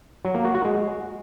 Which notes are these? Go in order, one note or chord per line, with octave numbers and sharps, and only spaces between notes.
F#3
A#3
F#4
F#4
G#3